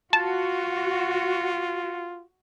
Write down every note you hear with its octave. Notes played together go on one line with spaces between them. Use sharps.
F4 F#4 A5